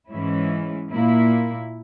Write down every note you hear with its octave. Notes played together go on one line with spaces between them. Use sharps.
G#2 E3 G#3 C#4 E4
A#2 A#3 E4